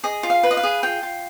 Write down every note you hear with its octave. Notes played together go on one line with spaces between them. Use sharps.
G#4 D#5
F4
F5
B4
D#5
F5
G#4
F4 G5
F4